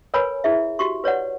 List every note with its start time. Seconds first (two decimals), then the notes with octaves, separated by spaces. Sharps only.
0.14 A#4 B4 C#5 G#5 B5
0.44 E4 G#4 E5
0.79 F#4 G4 C#6
1.04 B4 C#5 D5 F#5